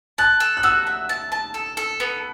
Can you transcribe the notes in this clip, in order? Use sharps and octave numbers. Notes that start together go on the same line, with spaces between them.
A5 F#6
A4
F#6
F#4 E6
E5
A5
A5
A4
A4
B3